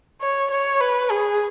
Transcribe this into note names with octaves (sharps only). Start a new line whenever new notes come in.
C#5
C#5
B4
G#4